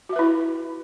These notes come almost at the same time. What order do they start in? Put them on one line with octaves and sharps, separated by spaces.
F#4 E5 B4 E4